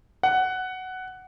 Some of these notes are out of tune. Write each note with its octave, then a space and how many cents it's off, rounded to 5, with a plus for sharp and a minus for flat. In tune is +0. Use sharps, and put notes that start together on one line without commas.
F#5 +10